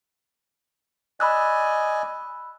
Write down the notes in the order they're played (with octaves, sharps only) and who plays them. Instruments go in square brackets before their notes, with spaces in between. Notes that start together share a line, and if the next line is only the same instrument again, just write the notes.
[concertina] D5 D#5 G#5 [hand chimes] B5 E6 F#6